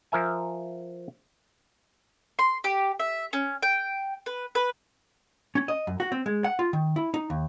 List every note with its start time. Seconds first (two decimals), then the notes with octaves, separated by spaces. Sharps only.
0.12 F3 A#4 E5 G#5
2.39 C6
2.64 G4
3.00 E5
3.33 C#4
3.63 G5
4.26 B4
4.55 B4
5.55 C#4
5.68 D#5
5.87 F#2
6.00 F#4
6.12 C4
6.26 G#3
6.44 F#5
6.59 F4
6.73 D#3
6.96 E4
7.14 D#4
7.30 D#2